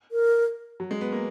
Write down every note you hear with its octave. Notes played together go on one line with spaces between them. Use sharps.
A#4
F#3
G#3
B3
A#3